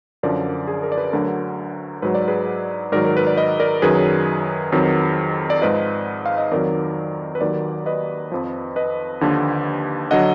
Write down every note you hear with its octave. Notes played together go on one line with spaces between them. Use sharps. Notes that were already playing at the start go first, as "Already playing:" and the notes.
F#2 D3 F3 A#4 D5
G#4
A#4
D5
G#4 B4
D2 D3 F#3 A#4
G#2 F#3 B4
D5
G#4 B4
G#2 D#3 F#3 A#4 D5
A#4
B4
D5
B4 D#5
A#4 D5
F#2 D#3 F#3 G#4 B4
F2 D#3 F#3
D5
G#2 F3 B4 D#5
F5
D#5
F2 D#3 F#3 A#4 D5
B4
D#2 D#3 F#3 A#4 D5
B4 D#5
F2 F3
B4 D#5
D#2 D3 F3
D3 F#3 D#5 F#5